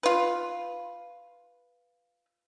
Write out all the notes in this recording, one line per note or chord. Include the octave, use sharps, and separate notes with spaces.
F4 B4